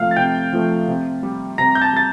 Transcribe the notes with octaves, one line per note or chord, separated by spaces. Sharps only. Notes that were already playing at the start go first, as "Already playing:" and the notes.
Already playing: C3 F3 A3 F5 F6
A6
C3 G5 G6
F3 A3
C3
G3
C3 A#5 A#6
G6
A5 A6
G3 A6